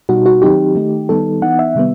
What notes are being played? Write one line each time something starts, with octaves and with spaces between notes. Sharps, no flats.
B2 G3 D#4 F#4
F#4
D#3 F#3 C4 D#4 G4
D#3 A3 D#4
D#3 G3 B3 D#4 A4
E3 B3 D#4 F#5
E5
C3 D#3 G3 B3